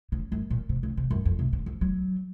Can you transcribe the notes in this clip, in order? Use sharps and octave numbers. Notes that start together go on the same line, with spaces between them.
C#3
F#2
A#2
C3
C#3
C3
F#2
F2
C3
C#3
F3
F#3